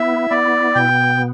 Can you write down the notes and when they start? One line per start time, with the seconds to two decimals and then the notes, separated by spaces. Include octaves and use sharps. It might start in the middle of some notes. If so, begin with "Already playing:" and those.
Already playing: B3 E4 E5
0.31 B3 D5
0.75 B2 G5